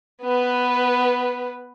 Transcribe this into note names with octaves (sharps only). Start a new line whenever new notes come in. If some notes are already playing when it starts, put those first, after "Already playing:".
B3 B4